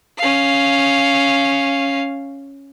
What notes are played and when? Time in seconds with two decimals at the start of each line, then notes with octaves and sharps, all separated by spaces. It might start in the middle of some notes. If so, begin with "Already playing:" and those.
0.18 C#4 F5